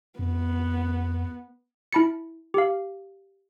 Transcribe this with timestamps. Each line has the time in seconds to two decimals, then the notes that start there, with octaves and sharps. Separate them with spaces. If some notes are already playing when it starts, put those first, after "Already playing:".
0.19 F2 B3
1.93 E4 A5 B5 A6 C#7
2.54 G4 F5